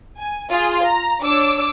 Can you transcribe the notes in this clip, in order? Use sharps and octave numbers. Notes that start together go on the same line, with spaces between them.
G#5
F4 G#4
A#5
D4 C#5 D6 E6